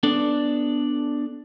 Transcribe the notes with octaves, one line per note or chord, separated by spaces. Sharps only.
B3 D4 A4 D5